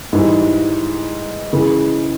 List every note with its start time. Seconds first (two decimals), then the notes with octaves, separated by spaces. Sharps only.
0.13 G#2 E3 G3
1.53 C#3 E3 G#3